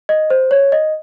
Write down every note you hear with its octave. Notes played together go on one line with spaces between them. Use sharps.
D#5
C5
C#5
D#5